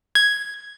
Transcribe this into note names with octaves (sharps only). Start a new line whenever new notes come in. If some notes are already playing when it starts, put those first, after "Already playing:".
G#6